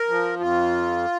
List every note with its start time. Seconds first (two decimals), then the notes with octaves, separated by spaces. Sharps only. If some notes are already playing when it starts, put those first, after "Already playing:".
Already playing: A#4
0.09 F3
0.40 F2 F4